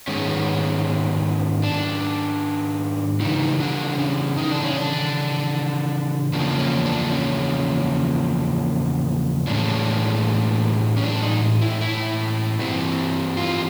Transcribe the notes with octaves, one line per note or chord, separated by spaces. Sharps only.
G#2 D#3 G#3 B3 C#4
D4
C#3 E3 G3 D#4
D4
C#4
D#4
D4
C#4
D4
E2 C#3 F3 A#3 D4
C#4
D4
C#4
A2 E3 G#3 C#4 D4
C#4
D4
D#4
E4
E4
G2 E3 G3 C4
F4